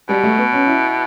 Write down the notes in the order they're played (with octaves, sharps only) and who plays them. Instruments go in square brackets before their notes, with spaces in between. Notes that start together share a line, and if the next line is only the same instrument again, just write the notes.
[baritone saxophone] B2 [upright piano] G3
[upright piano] A3
B3
C#4
E4